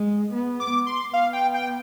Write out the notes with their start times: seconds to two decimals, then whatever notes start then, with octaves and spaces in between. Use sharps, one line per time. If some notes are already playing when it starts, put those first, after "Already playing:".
Already playing: G#3
0.34 B3
0.60 D6
0.86 C6
1.13 B3 F5
1.33 G5
1.54 G5